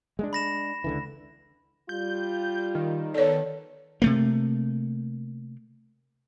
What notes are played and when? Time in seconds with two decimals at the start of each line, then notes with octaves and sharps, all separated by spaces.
0.19 G#3 A3 D4
0.33 B5 A#6 E7
0.84 C#2 D3 E3
1.89 G3 F4 G6
2.75 D#3
3.14 B3 A4 C#5 D5
4.02 C3 A3 A#3